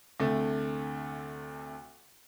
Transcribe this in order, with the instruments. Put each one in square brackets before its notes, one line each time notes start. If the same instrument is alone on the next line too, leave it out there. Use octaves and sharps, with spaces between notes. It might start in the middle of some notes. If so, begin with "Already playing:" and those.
[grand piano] D2 C3 A3